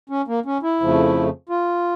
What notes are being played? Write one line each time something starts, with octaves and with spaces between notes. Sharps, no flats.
C#4
A#3
C#4
E4
F2 C#3 F3 A3
F4